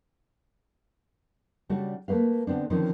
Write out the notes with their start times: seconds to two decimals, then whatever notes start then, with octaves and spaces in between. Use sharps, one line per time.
1.69 C#3 G3 D4 F#4 A4
2.08 A3 A#3 C4 B4 F5
2.47 D3 B3 C4 D4
2.70 D3 D#3 F3 C4 C#4 D#4